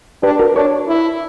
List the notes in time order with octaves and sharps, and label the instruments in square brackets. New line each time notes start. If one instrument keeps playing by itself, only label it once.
[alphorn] D4 [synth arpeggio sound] G4 B4
[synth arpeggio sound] F#4 A#4
[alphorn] D4 [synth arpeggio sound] A#4 C#5
[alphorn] E4